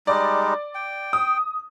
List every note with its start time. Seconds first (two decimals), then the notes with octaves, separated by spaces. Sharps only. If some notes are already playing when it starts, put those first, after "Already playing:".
0.07 G3 G#3 D#4 D5
0.75 G5
1.13 D#6